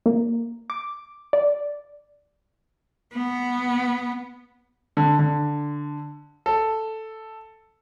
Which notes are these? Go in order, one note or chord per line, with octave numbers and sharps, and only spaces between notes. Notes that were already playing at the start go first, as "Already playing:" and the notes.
A#3
D6
D5
B3
D3
D3
A4